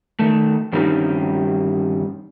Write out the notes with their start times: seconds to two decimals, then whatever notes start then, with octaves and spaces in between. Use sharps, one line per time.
0.19 D#3 A3
0.73 G2 D#3 G3 C4 C#4 D#4